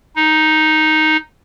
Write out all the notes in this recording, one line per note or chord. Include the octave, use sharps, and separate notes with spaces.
D#4